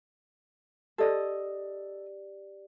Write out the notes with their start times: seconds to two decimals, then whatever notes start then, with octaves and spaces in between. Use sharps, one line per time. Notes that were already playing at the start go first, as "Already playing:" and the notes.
0.98 G4 A4 D5 D#5